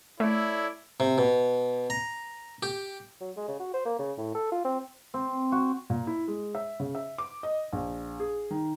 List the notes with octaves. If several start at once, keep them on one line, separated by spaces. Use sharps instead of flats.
A3 E4 A4 C#5 D5
C3
B2
A#5
G4
F#3
G#3
C#3
F#4
C5
A#3
C#3
A2
A4
F4
C4
C4
F#4
A#2
E4
G#3
E5
C#3
E5
D6
D#5
A#1
G#4
D#3